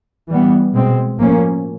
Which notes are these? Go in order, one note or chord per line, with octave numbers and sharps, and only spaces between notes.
E3 G3 B3
B2 G#3 C4
A2 F3 A#3 C#4